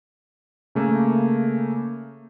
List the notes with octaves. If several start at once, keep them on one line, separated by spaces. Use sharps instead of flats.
C#3 A3 A#3